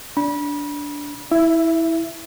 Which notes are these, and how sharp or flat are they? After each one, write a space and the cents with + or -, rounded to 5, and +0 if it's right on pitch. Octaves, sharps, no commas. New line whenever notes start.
D4 -15 B5 -30
E4 -15 E5 +15